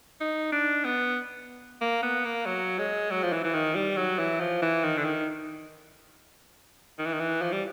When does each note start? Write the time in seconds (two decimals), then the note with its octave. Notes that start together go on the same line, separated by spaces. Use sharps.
0.21 D#4
0.52 D4
0.85 B3
1.81 A#3
2.03 B3
2.25 A#3
2.46 F#3
2.79 G#3
3.11 F#3
3.23 F3
3.33 E3
3.44 E3
3.54 D#3
3.75 G3
3.97 F#3
4.19 E3
4.40 F3
4.62 E3
4.83 D#3
4.97 D3
5.04 D#3
6.99 D#3
7.05 E3
7.13 D#3
7.20 E3
7.42 F3
7.52 G3